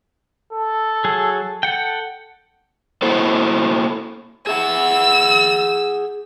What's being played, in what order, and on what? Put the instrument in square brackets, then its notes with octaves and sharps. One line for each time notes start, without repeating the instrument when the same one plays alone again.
[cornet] A4
[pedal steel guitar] F#3 G#4
A4 F#5 G5
[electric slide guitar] A#3 E4 F#4 A4 C5
[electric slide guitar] G#4 E5 F#5 [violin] E6